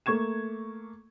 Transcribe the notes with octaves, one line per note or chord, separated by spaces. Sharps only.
A3 A#3 C#6 G#6 E7